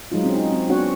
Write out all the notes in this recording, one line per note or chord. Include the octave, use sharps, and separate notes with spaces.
F#3 G#3 D#4 F4
C4 C#4
D#4
C4
B3 C#4 D4 F#4 C#5 F#5